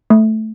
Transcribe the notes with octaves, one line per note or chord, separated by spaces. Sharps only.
A3